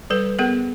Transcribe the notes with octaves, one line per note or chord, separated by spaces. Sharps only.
G3 A4 B4
B3 G#4 A#4